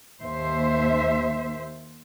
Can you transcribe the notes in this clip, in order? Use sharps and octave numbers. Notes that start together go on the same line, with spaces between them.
D#2 C5 E5